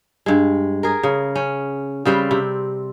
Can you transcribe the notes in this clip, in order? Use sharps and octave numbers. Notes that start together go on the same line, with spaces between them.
G2 G#3
G#4 A#4
C#3
C#4
C#3 G3 C4 B4
C3